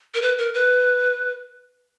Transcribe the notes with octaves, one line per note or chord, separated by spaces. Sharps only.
A#4
B4
A#4
B4